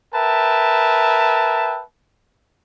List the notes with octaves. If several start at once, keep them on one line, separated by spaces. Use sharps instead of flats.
A#4 B4 E5 G5 A5